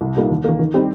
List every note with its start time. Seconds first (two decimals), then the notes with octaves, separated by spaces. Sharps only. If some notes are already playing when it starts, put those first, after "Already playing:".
0.01 C2
0.16 A#2 G3 A#3 D#4
0.30 D#2
0.44 D#3 A#3
0.59 D#3
0.74 G3 C4 D#4 G4